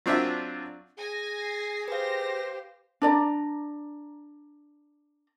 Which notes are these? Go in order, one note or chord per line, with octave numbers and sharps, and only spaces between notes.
F#3 C4 D4 F4 E5
G#4 G#5 A#6
C7
G4 B4 C5 F5 A#6
D4 D5 A#5